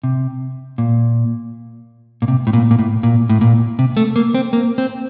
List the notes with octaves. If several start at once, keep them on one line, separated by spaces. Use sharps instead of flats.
C3
A#2
A#2
C3
A2
A#2
A#2
A2
A#2
A2
A#2
C3
A3
A#3
C4
A#3
C4